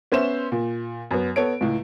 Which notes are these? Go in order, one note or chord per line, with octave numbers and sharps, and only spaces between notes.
B3 C#4 C5 E5 E7
A#2
F#2 B3
B3 A4 C#5 D7
C#2 A2